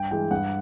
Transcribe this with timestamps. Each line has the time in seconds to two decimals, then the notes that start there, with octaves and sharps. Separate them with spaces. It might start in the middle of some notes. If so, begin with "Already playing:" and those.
Already playing: G2 G5
0.11 E3 G#3 G5
0.31 G2 F#5